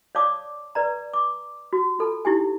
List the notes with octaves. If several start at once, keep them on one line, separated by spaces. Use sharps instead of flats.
C#5 D5 F5 A5 D6 D#6
B4 D5 A#5
D6
F#4
F4 A4 A5
D#4 E4 G4 G#5